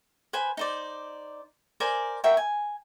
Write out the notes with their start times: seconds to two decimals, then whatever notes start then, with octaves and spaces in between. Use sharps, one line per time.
0.33 B4 C5 G#5 B5
0.57 D#4 C5 D5
1.80 A#4 C5 D5 G#5
2.24 F#4 A#4 E5 G5
2.37 G#5